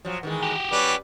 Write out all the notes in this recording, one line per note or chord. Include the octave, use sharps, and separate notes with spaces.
F3 F#3
D#3 E3 G#3
F#4 G4
G3 C#4 B4 D6